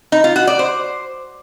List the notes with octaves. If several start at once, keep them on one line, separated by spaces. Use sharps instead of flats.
D#4
F4
F#4
D5
C5